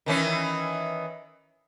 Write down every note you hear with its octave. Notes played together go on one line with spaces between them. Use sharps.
D#3 E3 C#4